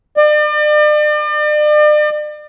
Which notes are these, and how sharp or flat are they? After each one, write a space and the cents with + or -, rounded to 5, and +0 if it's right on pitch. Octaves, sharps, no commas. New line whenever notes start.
D5 +40